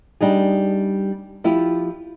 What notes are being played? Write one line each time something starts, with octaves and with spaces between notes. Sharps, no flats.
G3 D4 D#4 G#4
F3 E4 F4 G4